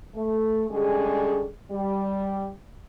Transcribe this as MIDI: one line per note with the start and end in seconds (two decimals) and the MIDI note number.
0.15 0.65 57
0.69 1.45 50
0.69 1.45 55
0.69 1.45 56
0.69 1.45 61
0.69 1.45 68
1.71 2.49 55